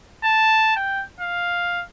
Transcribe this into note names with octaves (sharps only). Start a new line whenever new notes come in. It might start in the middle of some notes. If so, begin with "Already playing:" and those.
A5
G5
F5